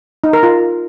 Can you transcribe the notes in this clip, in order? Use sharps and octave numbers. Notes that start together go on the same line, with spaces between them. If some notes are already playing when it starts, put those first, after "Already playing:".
D#4
A#4
F4